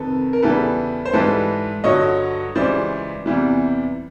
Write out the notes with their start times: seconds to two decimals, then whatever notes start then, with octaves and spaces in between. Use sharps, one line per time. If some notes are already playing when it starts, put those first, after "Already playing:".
Already playing: F2 C3 D#3 A4 B4
0.33 A#4
0.42 E2 C#3 E3 G3 A4 B4
1.05 C5
1.13 G#2 E3 G3 A4 B4
1.84 G2 D3 F#3 C#5 D#5
2.55 C#2 C#3 E3 G3 C5 D5
3.26 E2 C3 E3 G3